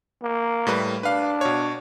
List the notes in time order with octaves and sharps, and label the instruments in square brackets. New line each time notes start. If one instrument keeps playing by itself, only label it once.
[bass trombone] A#3
[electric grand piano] A2 G3 B4
[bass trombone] D4 [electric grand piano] B4 F5
[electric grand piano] B2 C#5